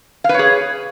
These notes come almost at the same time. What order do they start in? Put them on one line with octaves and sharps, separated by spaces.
F5 B4 C#5 G#4